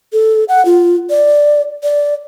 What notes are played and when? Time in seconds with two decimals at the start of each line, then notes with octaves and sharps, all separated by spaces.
0.13 A4
0.49 F#5
0.65 F4
1.10 D5
1.83 D5